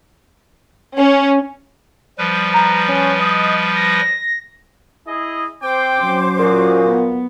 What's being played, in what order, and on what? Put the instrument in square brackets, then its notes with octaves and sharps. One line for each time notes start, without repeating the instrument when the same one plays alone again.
[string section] C#4
[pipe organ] F3 G3 B4
[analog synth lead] A#5
C#4
D#5
A#6
[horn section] E4 G#4 D#5
[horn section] C4 G5 [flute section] C5 D6
[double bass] F#3 C#4
[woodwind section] A#2 [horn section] F#4 G#4
[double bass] B3